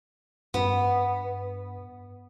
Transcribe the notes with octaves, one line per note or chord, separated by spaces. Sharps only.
G2 B3